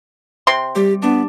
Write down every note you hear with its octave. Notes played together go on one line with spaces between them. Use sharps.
C3 C4 C6
G3 G4
B3 D4